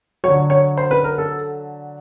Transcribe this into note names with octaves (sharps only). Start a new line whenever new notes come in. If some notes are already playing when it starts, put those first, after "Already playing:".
D3 F#3 C#5
C#5
C5
B4
A#4
A4